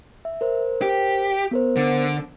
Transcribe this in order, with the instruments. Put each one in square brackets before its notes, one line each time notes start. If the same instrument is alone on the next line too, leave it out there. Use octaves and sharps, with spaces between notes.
[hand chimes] E5
A#4 C5
[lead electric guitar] G4
[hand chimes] B3 A#4 C5
[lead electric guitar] D3